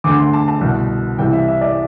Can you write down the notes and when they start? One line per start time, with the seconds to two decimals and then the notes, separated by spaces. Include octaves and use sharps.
0.04 D2 D6
0.09 D3
0.18 C6
0.33 A5
0.48 A5
0.61 C2 B2
1.18 C2 C3 E3 G5
1.33 E5
1.48 E5
1.61 D5